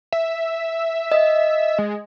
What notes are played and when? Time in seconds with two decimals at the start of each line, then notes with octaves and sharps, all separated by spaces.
0.12 E5
1.12 D#5
1.79 G#3